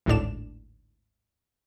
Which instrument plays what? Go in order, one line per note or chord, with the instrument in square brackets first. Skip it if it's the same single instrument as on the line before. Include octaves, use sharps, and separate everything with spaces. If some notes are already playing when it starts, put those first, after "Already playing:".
[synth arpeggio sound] G#1 D2 A2 D4 E7